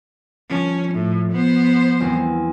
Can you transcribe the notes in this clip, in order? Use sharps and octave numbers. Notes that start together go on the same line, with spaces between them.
F3 C#4
A2
B3 C5
E2 F#3 C4